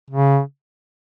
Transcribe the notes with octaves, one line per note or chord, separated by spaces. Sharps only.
C#3